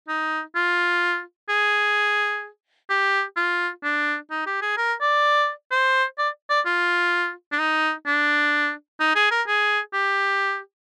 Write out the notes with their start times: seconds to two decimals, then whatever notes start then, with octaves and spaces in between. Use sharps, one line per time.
0.08 D#4
0.55 F4
1.49 G#4
2.90 G4
3.36 F4
3.83 D4
4.31 D#4
4.46 G4
4.62 G#4
4.77 A#4
5.01 D5
5.72 C5
6.18 D5
6.50 D5
6.66 F4
7.52 D4
7.59 D#4
8.06 D4
9.00 D#4
9.15 G#4
9.31 A#4
9.47 G#4
9.93 G4